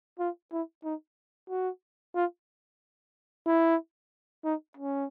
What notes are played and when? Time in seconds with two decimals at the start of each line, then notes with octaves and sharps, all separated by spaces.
0.19 F4
0.52 E4
0.84 D#4
1.50 F#4
2.15 F4
3.46 E4
4.45 D#4
4.77 C#4